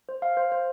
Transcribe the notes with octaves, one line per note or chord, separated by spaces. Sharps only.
C5
F5
C5
C5